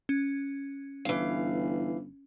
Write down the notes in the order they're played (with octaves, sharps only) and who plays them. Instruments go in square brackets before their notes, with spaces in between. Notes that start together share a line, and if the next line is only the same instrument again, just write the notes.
[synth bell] C#4
[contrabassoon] G1 [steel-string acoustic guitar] E3 F5